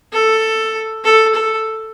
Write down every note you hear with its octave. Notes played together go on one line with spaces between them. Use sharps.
A4
A4
A4